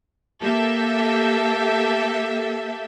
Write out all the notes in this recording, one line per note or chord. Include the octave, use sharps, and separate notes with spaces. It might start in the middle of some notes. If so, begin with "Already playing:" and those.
A#3 G4 A4 E5